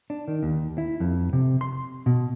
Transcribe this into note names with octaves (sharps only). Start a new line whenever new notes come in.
D4
D#3
D#2
E4
F2
C3
C6
B2